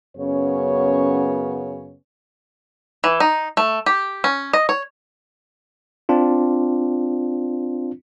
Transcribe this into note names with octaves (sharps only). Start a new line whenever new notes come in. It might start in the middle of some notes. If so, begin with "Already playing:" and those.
F#2 C#3 B3 C#4 C#5
E3
D#4
A3
G4
C#4
D#5
C#5
C4 D4 F4